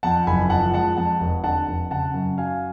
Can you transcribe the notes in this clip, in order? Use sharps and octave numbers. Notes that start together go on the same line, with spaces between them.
F2 F#5 A5
F#1 G#5 B5
F3 F#5 A5
G#3 F#5 A5
F2 F#5 A5
F1
D3 F#5 A5
F1
C#3 F#5 A5
F#2
F#3 F5 G#5